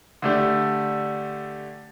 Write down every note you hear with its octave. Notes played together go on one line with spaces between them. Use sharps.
D3 A3 D4 G4